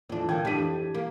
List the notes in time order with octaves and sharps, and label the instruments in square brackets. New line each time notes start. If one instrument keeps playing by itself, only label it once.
[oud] F2 D4 [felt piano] A#2 E3
[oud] D3 A#3 [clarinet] G5 [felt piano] G#6
[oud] F2 D4 [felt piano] E3 B6 D#7 [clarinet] G4
[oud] A#3